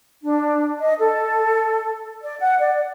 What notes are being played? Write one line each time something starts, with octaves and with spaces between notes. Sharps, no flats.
D4
D#5
A4
D5
F#5
D5